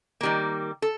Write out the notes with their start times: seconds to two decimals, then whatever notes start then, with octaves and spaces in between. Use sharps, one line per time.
0.21 D#3 G3 A#3
0.82 A4